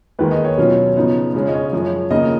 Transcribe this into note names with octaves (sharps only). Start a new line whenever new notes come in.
D#2 D#3 G#3 B4
D#5
C#5
B2 F#3 C#4 F4 C#5
C#3 F3 B3 D#4
C#3 G#3 C#4 F4
D#5
C#5
F#2 F3 G#3
D#2 C#3 F3 A#3 D#5